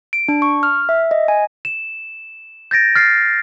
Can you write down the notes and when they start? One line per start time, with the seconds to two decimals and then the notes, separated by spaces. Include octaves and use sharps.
0.13 D7
0.28 D4
0.42 C#6
0.63 F6
0.89 E5
1.11 D#5
1.28 G#5
1.65 E7
2.71 G6 A6 A#6 D7
2.95 F6 A6 C7